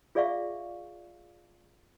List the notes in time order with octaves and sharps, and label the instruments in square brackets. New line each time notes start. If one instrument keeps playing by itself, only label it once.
[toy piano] F4 G#4 D5 E5 F5 C#6